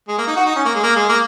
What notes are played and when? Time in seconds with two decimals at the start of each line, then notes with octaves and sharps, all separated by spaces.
0.08 G#3
0.18 A#3
0.27 D#4
0.36 F#4
0.45 D#4
0.56 C#4
0.65 A#3
0.74 G#3
0.83 A#3
0.96 G#3
1.09 A#3